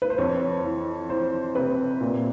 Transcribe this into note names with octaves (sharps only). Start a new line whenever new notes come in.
B4
C5
F2 C#5
E3
E3 C5
C3 B4
A#2